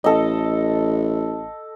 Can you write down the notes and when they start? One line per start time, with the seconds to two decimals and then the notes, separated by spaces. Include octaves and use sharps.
0.04 A1 A4 D#5